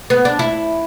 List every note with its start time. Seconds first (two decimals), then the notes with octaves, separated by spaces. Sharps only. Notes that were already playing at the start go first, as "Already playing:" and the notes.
0.10 B3
0.25 D4
0.39 E4